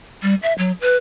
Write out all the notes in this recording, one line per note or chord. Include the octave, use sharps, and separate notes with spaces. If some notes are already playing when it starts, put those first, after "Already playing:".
G3
E5
F#3
B4